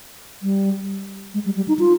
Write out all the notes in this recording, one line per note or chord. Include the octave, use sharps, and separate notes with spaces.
G3
G#3
G3
G3
D#4
F4